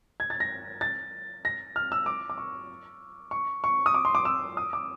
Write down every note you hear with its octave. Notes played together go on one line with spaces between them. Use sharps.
G#6
A6
A#6
A6
A#6
F6
E6
D6
D6
C#6
C#6
C#6
D#6
D6
C6
D6
E6
D#6
D6